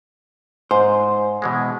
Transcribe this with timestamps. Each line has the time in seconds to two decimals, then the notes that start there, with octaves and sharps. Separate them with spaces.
0.71 G#2 C5
1.42 B2 E3 G#3